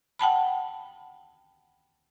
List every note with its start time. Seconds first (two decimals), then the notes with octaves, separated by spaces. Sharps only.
0.19 F#5 G5 A5 B5